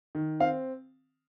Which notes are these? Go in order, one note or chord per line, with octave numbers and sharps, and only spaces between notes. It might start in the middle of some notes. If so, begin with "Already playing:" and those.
D#3
C4 F5